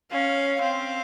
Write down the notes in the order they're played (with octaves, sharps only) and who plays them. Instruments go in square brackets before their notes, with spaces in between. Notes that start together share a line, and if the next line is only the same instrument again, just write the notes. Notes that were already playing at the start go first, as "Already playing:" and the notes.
[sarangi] C#4 [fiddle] F5
[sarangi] C4 [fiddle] F5